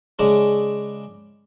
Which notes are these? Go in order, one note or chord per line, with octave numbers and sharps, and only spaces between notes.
C#3 G#3 D4